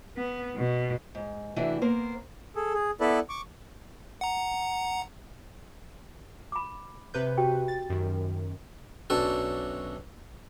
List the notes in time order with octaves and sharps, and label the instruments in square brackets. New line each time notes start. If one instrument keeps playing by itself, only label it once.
[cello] B3
B2
[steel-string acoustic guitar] G#2
C3 E3 A3 D4 E4 F#4
A#3 B3 A#4 C5
[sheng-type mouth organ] G#4 A4
G#4
B3 E4 A4 B4 D5
C#6 D6
[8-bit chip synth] F#5 A#5
[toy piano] B5 D6
[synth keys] C3 B4 G6
[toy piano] F#4 G4 G5
[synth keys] A6
F#2 D#3
[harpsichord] B1 F#2 D4 A4